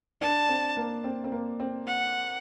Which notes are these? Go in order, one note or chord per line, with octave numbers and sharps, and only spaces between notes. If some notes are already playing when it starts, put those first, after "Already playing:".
D4 A5
C4
A#3
C4
C4
A#3
C4
F#5